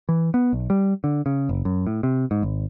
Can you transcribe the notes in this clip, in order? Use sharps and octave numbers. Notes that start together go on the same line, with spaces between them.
E3
B3
B1
G3
D3
C#3
F#1
F#2
A2
C3
G#2
G#1